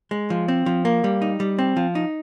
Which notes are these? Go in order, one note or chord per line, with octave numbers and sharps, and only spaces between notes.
G#3
F3
C4
F3
A#3
G3
D#4
G3
C4
F3
D#4